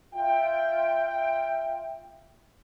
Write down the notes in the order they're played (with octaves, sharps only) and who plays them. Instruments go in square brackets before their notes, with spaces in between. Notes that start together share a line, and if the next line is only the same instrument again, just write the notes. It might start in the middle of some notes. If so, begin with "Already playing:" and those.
[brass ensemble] F4 E5 G5